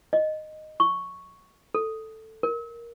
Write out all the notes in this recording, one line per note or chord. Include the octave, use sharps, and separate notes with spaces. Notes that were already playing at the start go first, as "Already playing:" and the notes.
D#5
C#6
A4
A#4